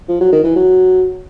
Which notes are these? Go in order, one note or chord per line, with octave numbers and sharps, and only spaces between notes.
F3
F#3
D#3
E3
F#3